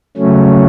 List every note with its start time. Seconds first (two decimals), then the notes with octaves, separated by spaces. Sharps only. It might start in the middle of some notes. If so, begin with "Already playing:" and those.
0.17 C#3 F#3 A3 C#4